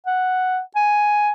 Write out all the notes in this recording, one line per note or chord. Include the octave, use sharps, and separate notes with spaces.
F#5
G#5